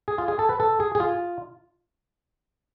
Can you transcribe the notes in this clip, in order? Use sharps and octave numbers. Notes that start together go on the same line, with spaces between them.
G#4
F4
G#4
A4
B4
A4
G#4
G#4
F4